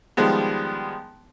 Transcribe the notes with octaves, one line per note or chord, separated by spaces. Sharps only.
D#3 F3 G3 G#3 B3